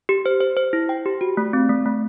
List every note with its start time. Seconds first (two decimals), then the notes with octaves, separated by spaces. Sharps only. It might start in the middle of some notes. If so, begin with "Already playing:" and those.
0.09 G4
0.26 C5
0.41 C5
0.57 C5
0.73 E4
0.89 G5
1.06 G4
1.21 F#4
1.37 A3
1.53 C4
1.69 A3
1.85 A3